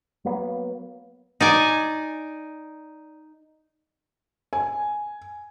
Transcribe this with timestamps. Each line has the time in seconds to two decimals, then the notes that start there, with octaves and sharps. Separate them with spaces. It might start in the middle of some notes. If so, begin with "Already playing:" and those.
0.25 F#3 A#3 B3
1.40 D#4 D5 G#5
4.53 G#5